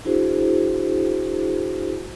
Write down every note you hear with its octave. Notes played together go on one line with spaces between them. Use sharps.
D4 E4 F#4 G#4 C5